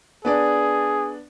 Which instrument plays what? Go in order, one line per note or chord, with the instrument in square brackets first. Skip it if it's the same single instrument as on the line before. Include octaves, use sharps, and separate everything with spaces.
[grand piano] B3 D4 D5 [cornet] G#4